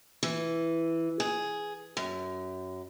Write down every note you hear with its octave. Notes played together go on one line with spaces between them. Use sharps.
E3
G#4
F#2